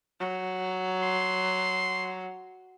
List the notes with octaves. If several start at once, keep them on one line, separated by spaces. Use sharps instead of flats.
F#3
C6